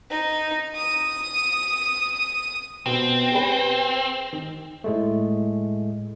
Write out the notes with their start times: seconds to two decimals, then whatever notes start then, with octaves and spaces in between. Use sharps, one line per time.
0.10 D#4
0.75 D#6
2.86 B2 B3 C4
3.31 G4 G#4 B4
4.33 D#3
4.84 A2 G#3 A3